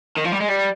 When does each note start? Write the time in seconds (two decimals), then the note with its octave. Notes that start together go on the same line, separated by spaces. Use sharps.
0.17 D#3
0.24 F3
0.32 G3
0.40 G#3
0.48 G3